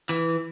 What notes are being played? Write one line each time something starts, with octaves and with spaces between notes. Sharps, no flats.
E3